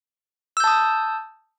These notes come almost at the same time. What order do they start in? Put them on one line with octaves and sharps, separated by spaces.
E6 G6 A5 D#6